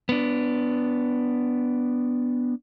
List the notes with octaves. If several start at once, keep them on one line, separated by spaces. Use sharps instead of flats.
B3 D4